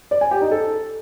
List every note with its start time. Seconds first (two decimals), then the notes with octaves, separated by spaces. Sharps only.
0.11 D5
0.21 G#5
0.31 G4
0.41 D#4
0.51 A4